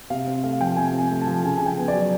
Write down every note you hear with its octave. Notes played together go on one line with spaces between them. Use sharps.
C3 F5
C4
A3 F5
F3 G5
C3 G#5
C4
G#5
A3
A5
F3
C#3 G#5
C#3 G#5
G5
B3
D5
F#3